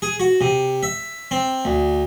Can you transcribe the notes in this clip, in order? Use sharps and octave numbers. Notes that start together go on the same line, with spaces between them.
G#4
F#4
C3
E5
C4
D2